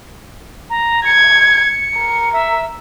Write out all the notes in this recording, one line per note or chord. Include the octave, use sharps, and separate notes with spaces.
A#5
G#6 C#7
A#4
E5